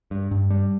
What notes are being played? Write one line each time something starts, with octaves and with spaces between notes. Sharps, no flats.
G2
G2
G3